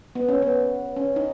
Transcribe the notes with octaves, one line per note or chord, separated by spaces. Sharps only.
B3
C#4
B3
C#4
D#4